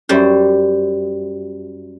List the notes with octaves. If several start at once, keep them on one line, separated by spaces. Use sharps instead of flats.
F#2 G3 C5